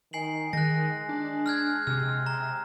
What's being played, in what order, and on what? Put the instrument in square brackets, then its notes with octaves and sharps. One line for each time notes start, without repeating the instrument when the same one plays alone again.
[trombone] D#3 [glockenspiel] G#5 C7 F#7
[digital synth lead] D#3 [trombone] G#3 [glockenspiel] F#6 A#6
[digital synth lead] D4
[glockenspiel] F6 F#6 G#6
[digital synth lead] C3 [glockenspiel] F6
[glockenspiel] A#5